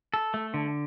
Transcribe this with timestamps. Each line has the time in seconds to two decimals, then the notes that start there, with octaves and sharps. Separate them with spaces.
0.14 A4
0.34 A3
0.54 D3